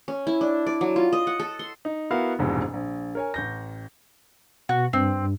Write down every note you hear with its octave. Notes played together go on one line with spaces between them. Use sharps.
C#4
E4
D4
D5
F#3
F4
D#5
F#5
A4
C6
D#4
B3 E4 F#4 A#4 F5
F1 A#1 G#2 B2 E3
A#1
A#4 C#5 G#5
A1 G6 A#6
B2 F#4
G2 C4